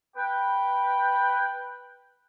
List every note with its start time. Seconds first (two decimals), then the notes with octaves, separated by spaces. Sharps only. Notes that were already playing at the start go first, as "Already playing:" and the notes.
0.16 B4 G5